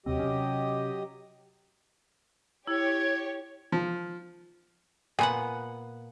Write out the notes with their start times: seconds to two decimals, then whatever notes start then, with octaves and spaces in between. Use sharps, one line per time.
0.06 D#2 C3 F#3 C4 G4 D#5
0.19 C3 C#4
2.67 E4 G4 C#5 G#6
3.72 F3
5.19 A#2 B3 F#5 G#5